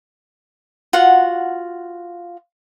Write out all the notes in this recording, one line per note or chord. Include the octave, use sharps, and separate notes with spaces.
F4 F#4 F#5